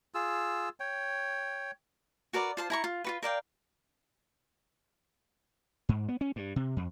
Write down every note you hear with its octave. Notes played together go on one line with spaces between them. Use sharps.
F4 G#4 E6
C#5 G5
F#4 A#4 B4 D5
F4 C5 A5
E4 A#5 C#6
F4
F4 F#4 B4
A#4 D5 F5 G5
G#2
B3
C#4
G2
C3
F2